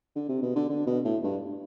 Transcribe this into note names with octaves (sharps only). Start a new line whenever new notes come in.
D3
C3
B2
D3
D3
B2
A2
G2